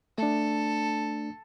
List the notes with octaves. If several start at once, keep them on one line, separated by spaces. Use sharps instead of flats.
A3 D4 A4